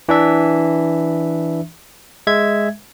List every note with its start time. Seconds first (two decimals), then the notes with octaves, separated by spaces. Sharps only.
0.09 E3 D4 E5
2.27 G#3 E5 G#6